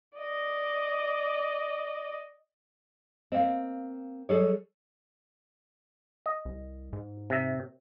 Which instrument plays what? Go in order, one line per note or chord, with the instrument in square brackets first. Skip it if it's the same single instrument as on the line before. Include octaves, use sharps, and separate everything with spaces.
[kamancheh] D5 D#5
[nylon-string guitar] A#3 C4 [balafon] D#5 F5
[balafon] F#3 G3 [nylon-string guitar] G#4 A4 C#5
[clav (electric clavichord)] D#5
[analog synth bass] C2
G#2
[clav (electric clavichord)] C3 E5